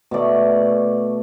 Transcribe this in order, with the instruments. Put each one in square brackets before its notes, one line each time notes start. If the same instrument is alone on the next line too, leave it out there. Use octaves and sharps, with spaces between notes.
[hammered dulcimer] B2 A3 D5